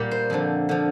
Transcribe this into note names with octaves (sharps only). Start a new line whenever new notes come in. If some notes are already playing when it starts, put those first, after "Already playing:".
Already playing: A#2 G3 A#3 A#4
C5
F2 D3 F3
D3 F3